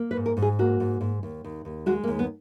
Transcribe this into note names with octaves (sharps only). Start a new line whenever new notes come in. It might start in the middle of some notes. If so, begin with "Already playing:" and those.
Already playing: A#3
B4
G#2
A#4
G#2
G#4
A#3 F#4
G#2
G#2
D#2
D#2
D#2
G#3 F#4
A#3
D#2
B3